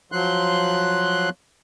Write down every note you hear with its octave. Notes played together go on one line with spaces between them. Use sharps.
F3 F#3 C6 F#6